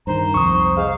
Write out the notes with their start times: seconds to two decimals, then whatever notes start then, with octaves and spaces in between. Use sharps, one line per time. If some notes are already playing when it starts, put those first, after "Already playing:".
0.07 G2 D#3 C5 A#5
0.34 C2 F2 C#6 D#6
0.76 G#2 F5